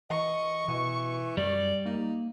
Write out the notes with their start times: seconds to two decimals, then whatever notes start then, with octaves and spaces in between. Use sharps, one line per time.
0.10 E3 D#5 C#6
0.68 B2 E3
1.37 F#2 G3 D5
1.86 A#3 D#4